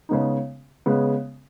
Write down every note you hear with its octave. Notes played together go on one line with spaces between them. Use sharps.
C#3 G#3 B3 D#4
C#3 G#3 B3